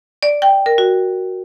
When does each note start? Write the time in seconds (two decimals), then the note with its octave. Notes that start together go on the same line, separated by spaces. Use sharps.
0.23 D5
0.42 G5
0.66 A#4
0.78 F#4